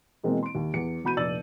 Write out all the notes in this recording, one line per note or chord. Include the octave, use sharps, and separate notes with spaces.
B2 E3 G#3 A#3 C4
C6 D7
D#2
E2 C#7
E1 F#4 B5 G6 D#7
F1 A#1 D5 E6 A6 F#7